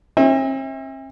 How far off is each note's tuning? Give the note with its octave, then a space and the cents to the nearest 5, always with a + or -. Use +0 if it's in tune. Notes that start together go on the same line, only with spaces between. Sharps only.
C4 +45 E5 -25